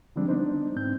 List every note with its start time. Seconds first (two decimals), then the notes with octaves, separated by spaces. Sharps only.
0.16 D3 F3 G3 G#3 C4 D4
0.28 B3 D4 D#4 C5
0.76 G#2 C4 G6